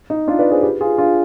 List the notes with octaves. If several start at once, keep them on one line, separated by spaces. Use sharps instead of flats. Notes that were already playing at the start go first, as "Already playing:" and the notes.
D#4
D4 F4
B4 D5
G#4 C5
G4 B4
F4 G#4
D4 F4